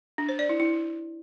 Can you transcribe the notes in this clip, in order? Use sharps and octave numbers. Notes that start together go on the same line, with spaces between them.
D4
C5
D5
E4
E4